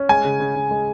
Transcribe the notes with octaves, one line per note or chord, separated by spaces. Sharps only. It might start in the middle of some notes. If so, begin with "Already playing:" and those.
Already playing: C#4
G#3 G#5
C#3
C#3
C#3
G#3